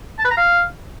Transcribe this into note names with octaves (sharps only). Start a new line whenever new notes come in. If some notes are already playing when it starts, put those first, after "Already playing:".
A5
B4
A#5
F5